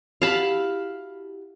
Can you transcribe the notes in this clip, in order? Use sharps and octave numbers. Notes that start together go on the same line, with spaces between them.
E4 F#4 G4 F5 A5 B5